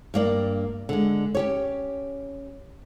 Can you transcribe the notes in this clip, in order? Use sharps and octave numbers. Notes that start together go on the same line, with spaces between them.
G2 A#3 D5
D3 G#3
C#4 G4 C#5